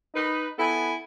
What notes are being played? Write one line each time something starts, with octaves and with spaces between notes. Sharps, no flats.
D#4 B4
B3 E4 A4 G#5